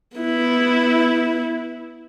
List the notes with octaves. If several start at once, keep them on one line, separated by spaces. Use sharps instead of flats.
B3 E4